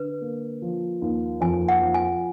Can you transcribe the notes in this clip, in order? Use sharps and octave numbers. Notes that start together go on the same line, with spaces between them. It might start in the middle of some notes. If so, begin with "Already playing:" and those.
Already playing: D3 B4
A#3
F3
D#2
F2 G#5
F#5
F3
G#5